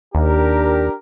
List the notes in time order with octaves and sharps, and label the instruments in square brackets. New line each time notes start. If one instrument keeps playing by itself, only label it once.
[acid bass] D#2 [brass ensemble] D4 G4 A#4